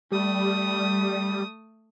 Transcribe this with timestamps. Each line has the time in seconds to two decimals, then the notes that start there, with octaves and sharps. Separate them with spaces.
0.12 G3 A3 D#6